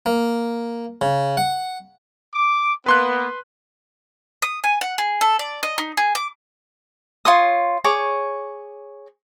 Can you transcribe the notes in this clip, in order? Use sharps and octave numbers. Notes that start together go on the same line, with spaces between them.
A#3
C#3
F#5
D6
A#3 B3 B4 C6 F#6
D#6
G#5
F#5
G#4
A4
D5
D#5
D#4
G#4
D6
F4 C#5 C6 D#6
G#4 C#5 C#6 D6